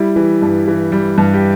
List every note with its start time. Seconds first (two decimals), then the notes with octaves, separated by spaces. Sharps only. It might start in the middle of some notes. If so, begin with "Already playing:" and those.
Already playing: G3 E4
0.16 E3
0.42 G2
0.68 E3
0.92 G3
1.18 G2
1.34 G4